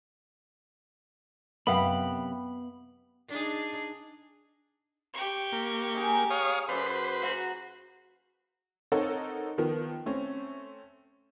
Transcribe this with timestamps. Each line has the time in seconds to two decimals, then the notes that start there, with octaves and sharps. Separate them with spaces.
1.67 F#2 C3 B3 E5 F5 G5 B5
3.29 D4 D#4 G#4
5.14 G4 C#6
5.52 A#3
5.95 D#4 G#4 A#5
6.30 C#5 F5 D#6
6.69 F#2 B4 C5 D5 B5
7.23 F#4 F5 F#5 A#5
8.92 C4 D#4 A4 A#4 C#5 F#5
9.58 D#3 F3 B3
10.06 A3 C4 C#4